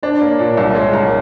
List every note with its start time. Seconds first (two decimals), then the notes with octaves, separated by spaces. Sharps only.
0.03 D4 C5
0.21 A#3 C#5
0.39 A#2 D5
0.57 C2 E5
0.75 G#3 C#5
0.93 C2 A#4